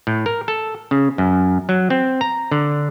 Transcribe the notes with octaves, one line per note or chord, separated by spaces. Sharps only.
A2
A#4
A4
C#3
F#2
F#3
C4
A#5
D3